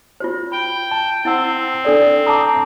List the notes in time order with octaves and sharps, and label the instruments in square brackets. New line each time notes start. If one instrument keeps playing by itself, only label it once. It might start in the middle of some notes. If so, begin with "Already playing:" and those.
[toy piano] F4 F#4 C5
[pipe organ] G5 [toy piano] B5
[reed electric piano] A5
[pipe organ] C4 [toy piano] E4 F#5 E6
[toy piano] D4 A4 D5
[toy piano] A5 D#6 [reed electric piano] A#5 D6